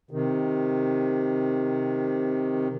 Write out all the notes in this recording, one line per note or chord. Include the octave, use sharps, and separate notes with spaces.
C3 D#3